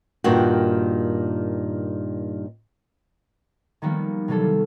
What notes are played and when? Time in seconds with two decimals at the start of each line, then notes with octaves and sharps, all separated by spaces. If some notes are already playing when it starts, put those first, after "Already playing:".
0.24 G2 A#2 D#3 F#4
3.82 D#3 F3 G3 A#3 B3
4.28 C3 E3 F#3 G3 A4
4.40 F4